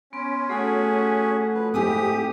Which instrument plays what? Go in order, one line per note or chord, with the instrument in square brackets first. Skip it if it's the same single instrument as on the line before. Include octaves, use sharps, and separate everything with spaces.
[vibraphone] B3 C6 [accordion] C#4
[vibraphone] A3 A4 [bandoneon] F#4 G#4
[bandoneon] F3 B4
[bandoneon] G#2 D#6 [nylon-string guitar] C4 E4 G#4 [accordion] G4